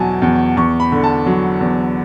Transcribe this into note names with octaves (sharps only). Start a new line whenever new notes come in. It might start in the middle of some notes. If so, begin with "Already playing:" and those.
Already playing: E2 B2 F#3 G#5 A5
E2
E2 C#6
B5
D3
A5
F#3
E2